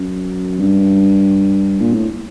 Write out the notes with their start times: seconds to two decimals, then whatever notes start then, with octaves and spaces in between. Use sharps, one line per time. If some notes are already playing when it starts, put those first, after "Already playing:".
Already playing: F#2
0.59 G2
1.81 A#2
1.94 A2